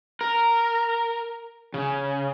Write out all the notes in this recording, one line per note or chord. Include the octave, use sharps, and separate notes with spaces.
A#4
C#3